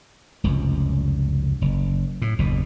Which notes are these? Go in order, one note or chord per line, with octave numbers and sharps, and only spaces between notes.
F1 C#2 F#2
F#1
A2
F#1 D#2 B2